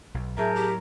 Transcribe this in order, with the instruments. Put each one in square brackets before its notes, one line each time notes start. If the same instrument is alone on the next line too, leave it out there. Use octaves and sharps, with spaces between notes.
[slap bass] B1
[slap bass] A2 F#3 [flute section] G#4 A5 G6 [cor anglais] A#4 [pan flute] E5
[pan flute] G4